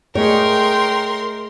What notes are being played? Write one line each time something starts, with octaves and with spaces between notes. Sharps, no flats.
A3 G#4 A#4 C#5 D#5 G5 C6